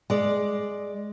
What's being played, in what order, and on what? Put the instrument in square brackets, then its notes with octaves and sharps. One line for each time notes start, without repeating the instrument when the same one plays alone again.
[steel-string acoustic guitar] G#3 D5